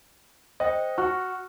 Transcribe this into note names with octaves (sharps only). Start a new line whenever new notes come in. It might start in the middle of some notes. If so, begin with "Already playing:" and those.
C5 D#5 G5
F#4 C#6 F6 F#6